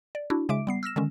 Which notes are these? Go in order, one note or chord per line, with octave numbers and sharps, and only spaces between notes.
D5
D4 E4 F#4
C#3 G#3 E5 D6 D7
G3 B3 C7
E6 F6 A#6 E7
D3 D#3 G#3 C#4